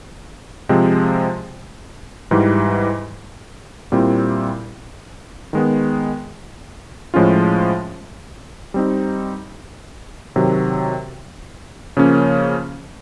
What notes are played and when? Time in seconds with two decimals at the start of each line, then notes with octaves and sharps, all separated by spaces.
0.69 C3 F3 G#3 C4
2.31 G#2 E3 G3
3.92 A#2 G3 C4 E4
5.53 D#3 G#3 B3
7.14 A2 F3 G#3 C#4 F4
8.74 G3 C4 D#4
10.36 C3 D#3 F#3
11.97 C#3 F3 A#3 C#4